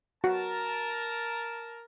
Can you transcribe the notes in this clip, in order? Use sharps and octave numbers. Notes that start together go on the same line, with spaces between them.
F#4 A#4 A5